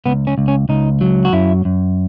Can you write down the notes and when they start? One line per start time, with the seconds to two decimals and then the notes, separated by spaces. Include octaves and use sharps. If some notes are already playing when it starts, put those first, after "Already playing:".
0.06 C#2 B3
0.27 C#4
0.38 C#2
0.48 C#4
0.69 C#2 D#4
1.01 F#3
1.25 F#4
1.33 F#2 E4
1.65 F#2